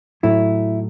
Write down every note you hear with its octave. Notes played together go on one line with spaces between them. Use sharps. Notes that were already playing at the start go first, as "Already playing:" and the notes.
A2 F#3 A3 E4